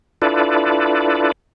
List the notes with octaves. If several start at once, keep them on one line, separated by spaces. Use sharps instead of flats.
D4 E4 F4 A4 B4 D5